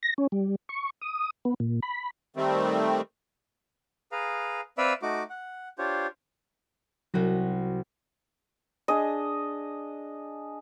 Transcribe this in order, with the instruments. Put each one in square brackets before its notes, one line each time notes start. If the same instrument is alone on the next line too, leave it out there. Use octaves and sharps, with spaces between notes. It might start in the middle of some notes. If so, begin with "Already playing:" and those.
[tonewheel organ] A#6
C#4
G3
C#6
D#6
B3
A#2
B5
[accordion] D#3 G3 A3 C4
[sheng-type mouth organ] G#4 B4 F5 A#5
C4 B4 D5 E5 F5 B5
A3 D#4 F#4 D6
F#5
D4 F4 G4 C5 C#5
[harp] C2 F#4 A#6 [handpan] F#3
[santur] D4 G#4 D#5